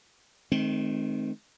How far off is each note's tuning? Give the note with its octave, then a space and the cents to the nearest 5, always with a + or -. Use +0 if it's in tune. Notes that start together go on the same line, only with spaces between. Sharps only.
D#3 -10 G#3 +45 C4 +0